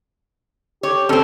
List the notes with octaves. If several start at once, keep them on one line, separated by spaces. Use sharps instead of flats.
G4 C#5
C4 C#4 A4